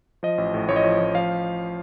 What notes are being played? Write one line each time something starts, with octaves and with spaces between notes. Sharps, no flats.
F3 D#5
A1
A2
A1 C#5
D#5
F3 C#5
A1
F3 F5